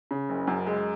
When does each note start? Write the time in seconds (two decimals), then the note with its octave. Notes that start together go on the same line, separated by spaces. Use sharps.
0.11 C#3
0.29 F#1
0.47 F#2
0.67 G#3